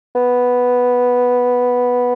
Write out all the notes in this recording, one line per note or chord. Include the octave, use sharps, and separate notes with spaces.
B3